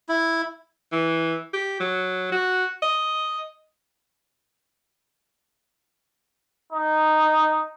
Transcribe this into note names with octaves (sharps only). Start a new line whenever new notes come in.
E4
E3
G4
F#3
F#4
D#5
D#4